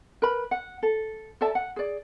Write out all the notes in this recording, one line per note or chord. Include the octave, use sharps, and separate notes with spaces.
A#4 B4 B5
F#5
A4
A4 D5 E5 A5
F#5
G#4 D5